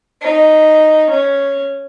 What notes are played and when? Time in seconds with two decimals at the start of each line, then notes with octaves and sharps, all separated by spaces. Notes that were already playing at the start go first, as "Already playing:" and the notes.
0.23 D#4
1.12 C#4